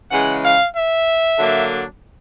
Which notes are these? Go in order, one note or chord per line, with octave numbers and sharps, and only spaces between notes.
C#3 E3 G#3 F#5
F5
E5
D3 F#3 A#3 D4